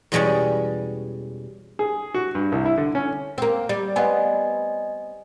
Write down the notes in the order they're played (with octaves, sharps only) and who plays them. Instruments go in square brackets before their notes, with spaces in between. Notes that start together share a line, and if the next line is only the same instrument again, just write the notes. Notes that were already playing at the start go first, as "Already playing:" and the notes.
[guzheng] E2 B2 G3 G#3 C#4
[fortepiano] G#4
F#4
G2
C2
E4
D3
C#4
[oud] A#3 C4
[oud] G3 [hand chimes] D5
[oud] B3 C4 [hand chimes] D#5 G#5